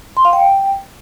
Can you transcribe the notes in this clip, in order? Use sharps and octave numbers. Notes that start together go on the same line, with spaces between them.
C6
F5
G5